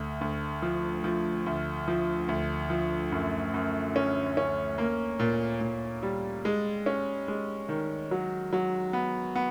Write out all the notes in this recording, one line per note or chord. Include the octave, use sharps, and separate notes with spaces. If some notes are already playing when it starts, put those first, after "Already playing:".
Already playing: D2
D2
F3
F3
D2
F3
D2
F3
F#2
F#2
C#4
C#4
A#3
A#2
A#2
G3
G#3
C#4
G#3
D#3
F#3
F#3
B3
B3